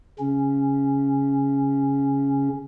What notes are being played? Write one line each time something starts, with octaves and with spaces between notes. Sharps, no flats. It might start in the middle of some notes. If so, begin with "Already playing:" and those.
C#3 C#4